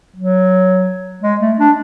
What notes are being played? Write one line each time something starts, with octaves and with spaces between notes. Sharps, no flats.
F#3
G#3
A3
D4